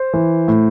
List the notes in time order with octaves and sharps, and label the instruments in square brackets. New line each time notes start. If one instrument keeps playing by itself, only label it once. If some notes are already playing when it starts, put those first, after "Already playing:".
Already playing: [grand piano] C5
E3
A2